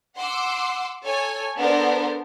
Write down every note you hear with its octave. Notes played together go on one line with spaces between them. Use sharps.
F#5 C6 D6 E6
A4 C#5 G#5
B3 D4 A4 A#4 C5